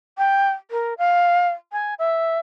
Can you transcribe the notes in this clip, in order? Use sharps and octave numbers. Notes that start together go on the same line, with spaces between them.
G5
A#4
F5
G#5
E5